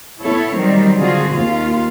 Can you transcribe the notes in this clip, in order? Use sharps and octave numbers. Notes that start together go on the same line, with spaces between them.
B3 E4 A4 C#5
D#3 F#3 G3 C4
D3 C4 F4 F#4 G#4
D#2 F4